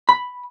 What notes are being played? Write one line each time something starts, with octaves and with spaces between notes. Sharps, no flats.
B5